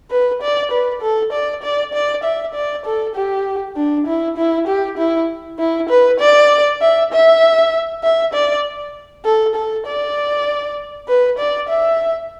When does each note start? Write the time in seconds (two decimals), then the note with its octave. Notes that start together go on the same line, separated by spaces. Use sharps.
0.11 B4
0.42 D5
0.71 B4
1.02 A4
1.32 D5
1.63 D5
1.93 D5
2.24 E5
2.54 D5
2.86 A4
3.16 G4
3.76 D4
4.07 E4
4.37 E4
4.68 G4
4.98 E4
5.59 E4
5.89 B4
6.20 D5
6.81 E5
7.12 E5
8.03 E5
8.34 D5
9.25 A4
9.55 A4
9.86 D5
11.08 B4
11.39 D5
11.69 E5